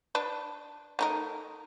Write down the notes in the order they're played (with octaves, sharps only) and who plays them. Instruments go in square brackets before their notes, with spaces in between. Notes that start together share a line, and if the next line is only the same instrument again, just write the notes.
[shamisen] D4 B4
A3 D#4 A#4